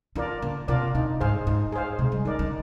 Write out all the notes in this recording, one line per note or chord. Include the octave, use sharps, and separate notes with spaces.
D#3 D4 F4 A#4 D5
D3 A#3
C3 D4 F4 A#4 D5
C3 D#4
G#2 G#4 C5 F5
G#2 D#4
G#4 C5 F5
C3 G#3
G3
D#3 D#4 A#4 D5
D3